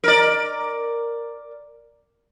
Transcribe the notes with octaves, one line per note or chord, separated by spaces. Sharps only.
A#4 D5